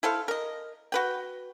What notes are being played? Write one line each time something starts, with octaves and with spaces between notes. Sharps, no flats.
E4 A4 C5 F5
A#4 D#5
F#4 B4 G5